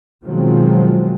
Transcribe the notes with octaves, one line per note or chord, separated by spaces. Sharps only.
B2 D#3 F3 F#3 G#3 C4